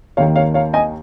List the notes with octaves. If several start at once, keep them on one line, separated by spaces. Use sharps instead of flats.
D#2 D#3 A#3 C#5 F5
C#5 F5
C#5 F5
D#5 G#5